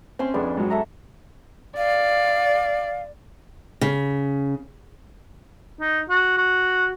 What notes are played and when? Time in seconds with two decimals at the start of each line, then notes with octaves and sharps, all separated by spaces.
0.19 C4 C#4 G#5 C6
0.34 F2 B3 D4 G#4 G5
0.57 G#2 F#3
0.70 A4 E5 A#5
1.77 D5 F5
3.81 C#3
5.81 D#4
6.10 F#4
6.38 F#4